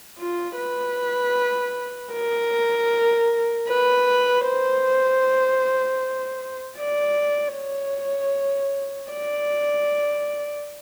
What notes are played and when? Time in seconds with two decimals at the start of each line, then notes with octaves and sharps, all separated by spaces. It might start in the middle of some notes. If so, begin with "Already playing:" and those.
0.19 F4
0.57 B4
2.13 A#4
3.68 B4
4.47 C5
6.79 D5
7.56 C#5
9.12 D5